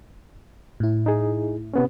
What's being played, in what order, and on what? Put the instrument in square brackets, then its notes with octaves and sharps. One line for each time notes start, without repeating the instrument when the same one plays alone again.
[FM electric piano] A2 E4
[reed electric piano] D#4 G#4
C3 B3 C#4